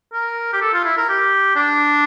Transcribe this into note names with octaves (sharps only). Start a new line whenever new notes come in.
A#4
G4
A4
F4
E4
A#4
G4
D4